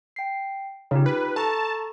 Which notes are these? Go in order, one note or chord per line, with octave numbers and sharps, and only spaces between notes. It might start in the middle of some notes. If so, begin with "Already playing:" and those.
G5 C7
C#3 D#4 F4 G4
B4
A4 A5 A#5 C#6